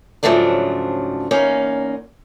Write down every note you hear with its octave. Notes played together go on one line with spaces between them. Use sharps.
G#2 C#3 F3 F#3 A3 D4
E2 A#3 C#4 D#4